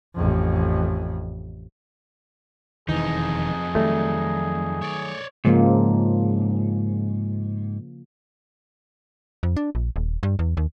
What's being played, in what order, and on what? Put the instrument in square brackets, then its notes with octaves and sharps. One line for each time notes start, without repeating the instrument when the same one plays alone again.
[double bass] A1 F2
[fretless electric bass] E1 D#3 E3 [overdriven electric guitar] F2 D#4 [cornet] G#4
[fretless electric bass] D#3 F#3 G3 [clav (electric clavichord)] A3
[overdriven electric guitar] C#5 D5
[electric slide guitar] G#2 [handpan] C#3 F3 A#3
[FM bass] F2
D4
A#1
D#1
G2
E2
D#2